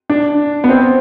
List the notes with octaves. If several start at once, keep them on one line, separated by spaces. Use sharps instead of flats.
D4
B3
C4